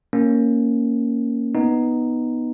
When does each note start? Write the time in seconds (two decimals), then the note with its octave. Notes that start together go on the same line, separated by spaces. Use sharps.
0.13 A#3 C#4
1.55 B3 D#4